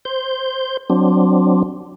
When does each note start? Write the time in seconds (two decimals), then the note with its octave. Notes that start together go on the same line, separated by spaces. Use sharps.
0.05 C5 G6
0.90 F#3 C4 D4